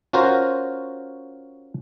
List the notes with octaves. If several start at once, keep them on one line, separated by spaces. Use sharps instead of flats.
C#4 F4 F#4 A#4 C5